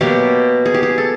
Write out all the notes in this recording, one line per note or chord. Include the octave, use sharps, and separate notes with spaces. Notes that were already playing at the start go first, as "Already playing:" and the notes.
B2 F#3 A#3 G4
G#4
G4
G#4
A4